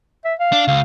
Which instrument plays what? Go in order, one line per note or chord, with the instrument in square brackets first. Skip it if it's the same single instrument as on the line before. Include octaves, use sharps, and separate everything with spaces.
[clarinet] E5
F5
[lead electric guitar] D4
[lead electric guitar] C#2 [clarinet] F5